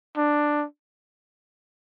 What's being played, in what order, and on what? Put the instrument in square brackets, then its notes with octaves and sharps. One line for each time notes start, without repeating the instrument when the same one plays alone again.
[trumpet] D4